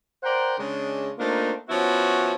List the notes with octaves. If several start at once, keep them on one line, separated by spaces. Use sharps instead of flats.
A#4 C5 D5 F#5 G5 A#5
C#3 G#3 D4
A3 A#3 C4 D4 D#4 F4
F3 B3 C#4 E4 F#4